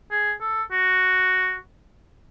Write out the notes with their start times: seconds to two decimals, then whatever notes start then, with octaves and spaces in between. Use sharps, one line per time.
0.11 G#4
0.41 A4
0.72 F#4